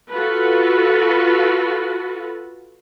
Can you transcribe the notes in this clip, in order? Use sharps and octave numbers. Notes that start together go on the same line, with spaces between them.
F4 F#4 A4 B4